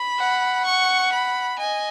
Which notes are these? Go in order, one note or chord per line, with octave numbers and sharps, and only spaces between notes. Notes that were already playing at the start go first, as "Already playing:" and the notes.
Already playing: B5
F#5
C#6
B5
D#5 G#5